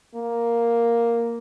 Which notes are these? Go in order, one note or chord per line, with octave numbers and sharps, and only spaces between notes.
A#3